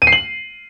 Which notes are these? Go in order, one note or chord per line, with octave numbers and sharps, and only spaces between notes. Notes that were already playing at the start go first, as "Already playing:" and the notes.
D#7
C7
F#7